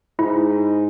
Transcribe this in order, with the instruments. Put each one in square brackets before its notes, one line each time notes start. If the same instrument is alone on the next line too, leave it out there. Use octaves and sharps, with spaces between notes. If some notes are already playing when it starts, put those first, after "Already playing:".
[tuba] G#2 [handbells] E4